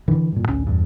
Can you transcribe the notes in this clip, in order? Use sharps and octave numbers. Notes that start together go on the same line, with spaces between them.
D3 E3
G2 A#2
A1 D2 C#4
E2 G2